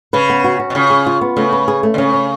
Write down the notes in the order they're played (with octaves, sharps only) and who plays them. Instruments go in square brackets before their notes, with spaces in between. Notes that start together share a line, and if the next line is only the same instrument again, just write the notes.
[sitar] C#3 [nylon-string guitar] B4
[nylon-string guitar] B3
F#4
F#4
[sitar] B2
[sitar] C#3 [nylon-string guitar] F4
[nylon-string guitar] G#4
F4
B3
[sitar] C#3 [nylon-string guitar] A3
[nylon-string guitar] B4
G#4
A3
[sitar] D3
[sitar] C#3 [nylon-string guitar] C#4
[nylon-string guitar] C#4